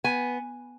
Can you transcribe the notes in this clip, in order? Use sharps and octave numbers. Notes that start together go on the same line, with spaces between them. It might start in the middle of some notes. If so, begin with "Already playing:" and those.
B3 G#5